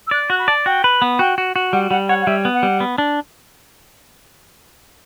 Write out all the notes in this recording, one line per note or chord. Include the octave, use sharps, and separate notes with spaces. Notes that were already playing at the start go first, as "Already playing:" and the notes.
E6
D5 F#6
F#4 F#6
B5
D5 A5
F#4 G5
B4
B3
F#4 G5
F#4
F#4
G3 F#5
G3 F#5
C#5 F#5
F#5
G3 E5
B3
F#5
G3
B3
D4